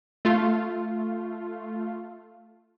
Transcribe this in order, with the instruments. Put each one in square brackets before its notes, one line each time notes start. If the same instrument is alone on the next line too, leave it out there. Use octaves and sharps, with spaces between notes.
[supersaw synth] A3 F4